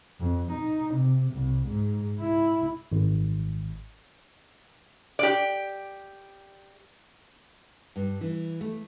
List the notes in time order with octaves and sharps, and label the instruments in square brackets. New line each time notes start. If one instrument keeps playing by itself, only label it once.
[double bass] F2
D#4
C3
C2
G#2
E4
[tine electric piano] G#1
[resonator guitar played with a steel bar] G4 D5
[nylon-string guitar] G2
E3
A3